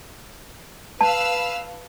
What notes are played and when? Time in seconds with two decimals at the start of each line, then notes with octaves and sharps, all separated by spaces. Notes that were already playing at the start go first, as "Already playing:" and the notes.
1.01 B4 F5 A5 E6